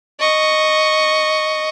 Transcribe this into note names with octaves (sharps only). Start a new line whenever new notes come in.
D#5 C#6